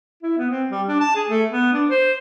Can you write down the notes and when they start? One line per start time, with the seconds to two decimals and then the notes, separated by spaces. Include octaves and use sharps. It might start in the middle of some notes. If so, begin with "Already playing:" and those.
0.23 E4
0.37 B3
0.50 C4
0.71 G3
0.88 D4
1.00 A5
1.15 G#4
1.29 A3
1.50 B3
1.72 D4
1.89 C5